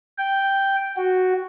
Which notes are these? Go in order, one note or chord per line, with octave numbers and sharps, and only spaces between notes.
G5
F#4